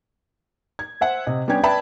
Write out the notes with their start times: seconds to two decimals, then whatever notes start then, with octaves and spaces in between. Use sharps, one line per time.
0.79 G#6
1.01 C5 E5 F#5
1.27 C3 D#5
1.48 G3 B3 C#4 D4 G4 G#6
1.63 B4 D5 E5 G5 A5 B5